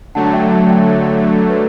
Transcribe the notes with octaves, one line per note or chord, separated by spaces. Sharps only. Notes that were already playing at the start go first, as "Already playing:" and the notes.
D3 F#3 A3 F#5 A5
E5 G5
F#5 A5
E5 G5
C#5 E5
B4